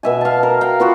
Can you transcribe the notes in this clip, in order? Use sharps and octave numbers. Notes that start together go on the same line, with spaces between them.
B2 E5 G#5
F5 A5
A#4
F5 G5 A#5
B3 F4 F#4